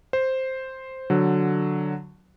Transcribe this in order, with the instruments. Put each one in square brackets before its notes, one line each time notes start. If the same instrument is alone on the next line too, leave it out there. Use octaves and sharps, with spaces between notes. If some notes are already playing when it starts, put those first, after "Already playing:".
[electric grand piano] C5
D3 F#3